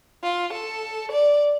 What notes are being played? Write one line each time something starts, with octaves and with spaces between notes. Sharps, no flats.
F4
A4
D5